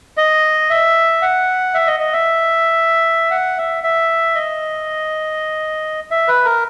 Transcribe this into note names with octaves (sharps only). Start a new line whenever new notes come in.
D#5
E5
F#5
E5
D#5
D#5
E5
F#5
E5
E5
D#5
E5
B4
A#4